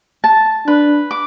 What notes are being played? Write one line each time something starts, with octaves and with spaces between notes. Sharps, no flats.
A5
D4 B4
D6